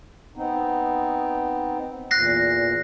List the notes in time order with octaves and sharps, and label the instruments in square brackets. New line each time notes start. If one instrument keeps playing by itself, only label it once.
[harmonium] B3 C4 D#4
[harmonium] E2 A#2 [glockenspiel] F#6 A#6 C7